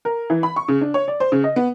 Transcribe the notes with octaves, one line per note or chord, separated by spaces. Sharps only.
A#4
E3
B5
C#6
C#3
D4
C#5
D5
C5
C#3
D#5
B3